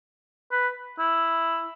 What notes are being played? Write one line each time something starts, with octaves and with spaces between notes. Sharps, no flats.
B4
E4